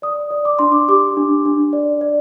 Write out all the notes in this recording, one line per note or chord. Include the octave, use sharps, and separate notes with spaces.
D5 D#6
D5
D6
D4 C6
D6
G4 D6
D4
D4
D5
D5